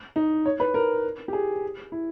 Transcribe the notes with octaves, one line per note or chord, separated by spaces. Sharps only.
D#4
C#5
B4
A#4
G4
G#4
E4